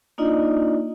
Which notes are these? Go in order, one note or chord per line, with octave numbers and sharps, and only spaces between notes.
A#3 D4 D#4 F4 D5 D#5